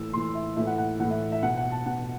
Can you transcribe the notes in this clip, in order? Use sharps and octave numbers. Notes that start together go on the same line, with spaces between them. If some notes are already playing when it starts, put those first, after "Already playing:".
Already playing: A2 E3 E6
A2 E3 C6
E5
A2 E3 E5
F#5
F#5
A2 E3 F#5
E5
E5
B2 F#5
F#5
A5
B2 F#5